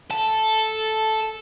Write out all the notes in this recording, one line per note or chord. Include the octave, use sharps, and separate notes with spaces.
A4